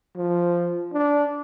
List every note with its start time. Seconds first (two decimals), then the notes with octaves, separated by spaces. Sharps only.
0.17 F3
0.94 D4